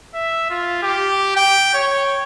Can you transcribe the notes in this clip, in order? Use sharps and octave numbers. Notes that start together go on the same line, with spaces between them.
E5
F4
G4
G5
C#5